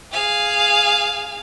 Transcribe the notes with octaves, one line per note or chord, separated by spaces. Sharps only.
G#4 F5